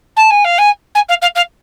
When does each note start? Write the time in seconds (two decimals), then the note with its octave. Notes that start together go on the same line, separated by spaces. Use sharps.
0.16 A5
0.30 G#5
0.44 F5
0.58 G#5
0.95 G#5
1.09 F5
1.22 F5
1.35 F5